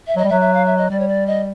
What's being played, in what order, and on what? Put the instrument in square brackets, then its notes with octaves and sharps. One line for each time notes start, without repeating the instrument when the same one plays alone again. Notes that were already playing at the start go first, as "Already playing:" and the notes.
[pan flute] E5
[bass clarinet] F#3 [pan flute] D#5
[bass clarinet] G3
[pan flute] E5
[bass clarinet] F#3
[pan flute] E5
F5
E5
D#5
[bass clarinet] G3 [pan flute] D5
[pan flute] C#5
D5
D#5